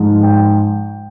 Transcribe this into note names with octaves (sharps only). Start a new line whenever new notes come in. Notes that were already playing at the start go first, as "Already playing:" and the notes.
Already playing: G#2 F3
G5